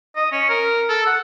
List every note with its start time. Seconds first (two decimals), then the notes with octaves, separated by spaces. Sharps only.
0.16 D#5
0.32 C#4
0.49 A#4
0.89 A4
1.06 F#5